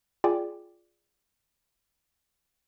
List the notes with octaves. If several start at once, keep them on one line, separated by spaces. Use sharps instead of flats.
F4 G#4 D5 G5 G#5 D6